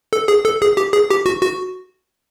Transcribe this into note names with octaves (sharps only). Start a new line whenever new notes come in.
A4
G#4
A4
G#4
G4
G#4
G4
F#4
F#4